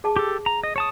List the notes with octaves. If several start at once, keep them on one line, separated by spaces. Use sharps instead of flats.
G#4 A5 D6
G4 A4
A#5
D#5
C#5 A5 D#6